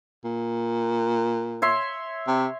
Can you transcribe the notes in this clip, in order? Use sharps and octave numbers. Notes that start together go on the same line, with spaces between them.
A#2
C#5 E5 C6
C3